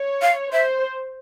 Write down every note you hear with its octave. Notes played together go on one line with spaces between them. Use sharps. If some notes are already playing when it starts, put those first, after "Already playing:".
Already playing: C#5
F5
C5 E5